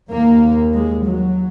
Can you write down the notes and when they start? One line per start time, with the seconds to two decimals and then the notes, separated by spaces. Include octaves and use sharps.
0.10 D#2 A#3
0.73 G#3
1.05 F#3